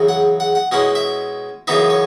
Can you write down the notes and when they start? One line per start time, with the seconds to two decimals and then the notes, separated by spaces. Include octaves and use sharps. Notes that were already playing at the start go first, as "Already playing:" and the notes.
Already playing: E2 C#3 F#3
0.09 F#5
0.40 F#5
0.55 F#5
0.72 B2 G#3 C#4 E4 F#5
0.95 E5
1.67 F#2 C#3 E3 B3 D#4 E5
1.90 C#5